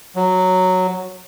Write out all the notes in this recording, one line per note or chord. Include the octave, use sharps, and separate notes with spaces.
F#3